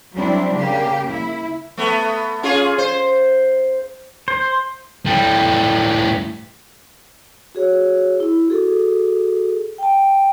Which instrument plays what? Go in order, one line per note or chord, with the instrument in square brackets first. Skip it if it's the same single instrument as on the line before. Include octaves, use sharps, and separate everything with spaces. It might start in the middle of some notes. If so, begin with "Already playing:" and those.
[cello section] F#3 G3 C4 D4 E4
C#3 A#3 G4
E4
[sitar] A3 B3
C#4 F4 G#4
C5
[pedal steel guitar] C5
[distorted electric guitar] A2 G3
[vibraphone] F#4 G#4 C#5
E4
F#4 G#4 A4
G5 A5